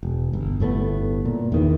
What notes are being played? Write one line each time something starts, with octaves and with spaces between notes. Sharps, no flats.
E1
G1
G1 A2 A3 B3
A#2
E2 D#3 E3